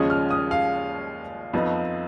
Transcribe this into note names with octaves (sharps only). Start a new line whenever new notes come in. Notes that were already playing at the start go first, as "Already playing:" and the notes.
Already playing: D#2 C#3 F3 G#3 C#4 D#6
F6
D#6
F5
F2 F3 B3 D#4